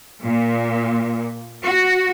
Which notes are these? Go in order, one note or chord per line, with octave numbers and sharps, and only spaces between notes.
A#2
F#4